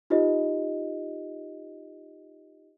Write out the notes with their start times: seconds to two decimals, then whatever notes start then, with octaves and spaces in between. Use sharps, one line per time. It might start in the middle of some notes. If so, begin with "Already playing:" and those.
0.10 D#4 F4 G4 C5 D#5